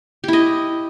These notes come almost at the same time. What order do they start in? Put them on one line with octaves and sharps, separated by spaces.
G4 E4 D#5